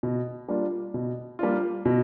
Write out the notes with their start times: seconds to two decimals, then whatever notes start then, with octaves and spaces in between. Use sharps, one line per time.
0.03 B2
0.48 G3 A#3 D4 F4
0.94 B2
1.39 G3 A#3 D4 F4
1.85 B2